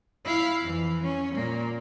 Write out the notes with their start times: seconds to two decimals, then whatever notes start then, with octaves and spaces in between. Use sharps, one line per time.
0.25 E4 F5
0.61 F2 E3
1.04 C#4
1.35 A#2 A#3